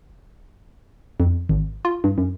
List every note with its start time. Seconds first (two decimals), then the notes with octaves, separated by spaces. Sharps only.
1.20 F2
1.49 G#1
1.85 F4
2.04 G2
2.18 F#2